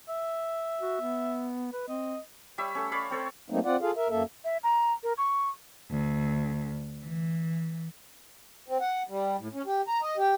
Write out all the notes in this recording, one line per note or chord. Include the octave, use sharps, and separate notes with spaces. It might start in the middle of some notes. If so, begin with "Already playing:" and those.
E5
F#4
B3
B4
C4 D#5
G3 C#5 E5
A3 C#4
C#5 D5 F5 B5
C4 A4 C#5
F#3 A3 A#3 C4 D#4
C4 F4 D5 F#5
F4 G#4 A4 F5
A#4 E5
F#2 A#3 A4 E5
E5
A#5
A#4
C#6
D2
E3
C4
F#5
G3
A2
C#4
G4
A#5
D#5
G4